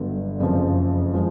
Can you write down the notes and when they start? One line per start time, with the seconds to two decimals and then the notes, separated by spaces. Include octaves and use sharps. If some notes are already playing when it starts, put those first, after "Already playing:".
Already playing: G1 G2 D3 F#3 B3
0.40 F#1 F2 C#3 F3
1.14 F3 G#3